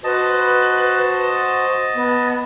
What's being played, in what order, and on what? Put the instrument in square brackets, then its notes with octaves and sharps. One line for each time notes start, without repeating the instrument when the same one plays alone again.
[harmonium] F#4 C5 [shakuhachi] B4 [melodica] D#5 A5
[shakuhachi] B3